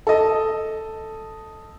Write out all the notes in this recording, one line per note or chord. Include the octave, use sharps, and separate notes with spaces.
A4 D#5